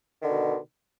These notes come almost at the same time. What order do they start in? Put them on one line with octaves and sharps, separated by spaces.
D#3 D3 B2